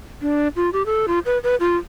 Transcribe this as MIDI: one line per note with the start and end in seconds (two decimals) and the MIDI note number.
0.22 0.48 62
0.56 0.70 65
0.73 0.83 67
0.86 1.06 69
1.08 1.19 65
1.26 1.38 71
1.44 1.55 71
1.60 1.76 65